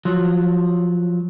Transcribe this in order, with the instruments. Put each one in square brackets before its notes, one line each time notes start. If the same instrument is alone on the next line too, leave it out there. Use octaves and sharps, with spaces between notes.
[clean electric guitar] F3 F#3